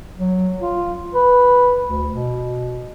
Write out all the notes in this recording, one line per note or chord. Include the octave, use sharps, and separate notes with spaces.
F#3
F4
B4
D2
B2